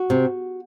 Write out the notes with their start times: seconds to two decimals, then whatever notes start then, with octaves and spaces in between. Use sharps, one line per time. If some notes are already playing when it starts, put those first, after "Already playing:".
Already playing: F#4
0.10 C3